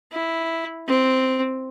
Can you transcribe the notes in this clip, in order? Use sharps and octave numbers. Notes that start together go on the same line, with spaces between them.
E4
C4